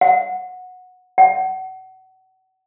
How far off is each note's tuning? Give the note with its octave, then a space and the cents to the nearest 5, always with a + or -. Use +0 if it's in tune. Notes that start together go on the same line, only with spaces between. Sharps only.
F#5 -15
F#5 +30